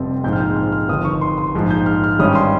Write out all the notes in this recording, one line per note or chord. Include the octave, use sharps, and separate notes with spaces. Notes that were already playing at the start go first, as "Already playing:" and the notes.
Already playing: F1 F2 C3 G3 C4
A#1 G#2 F3 G#3 C4 G6
F6
G6
F6
F6
G1 F2 D#3 D#6
C#6
C6
C6
A#1 G#2 F3
G6
F6
F6
G#1 G2 G3 C#4 D#6
C6